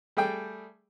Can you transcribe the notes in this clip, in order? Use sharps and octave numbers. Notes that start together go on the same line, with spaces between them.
G3 A3 G#4 G5